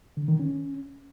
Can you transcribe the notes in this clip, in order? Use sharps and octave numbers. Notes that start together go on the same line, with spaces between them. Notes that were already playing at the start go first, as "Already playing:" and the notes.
D3
D#3
C#4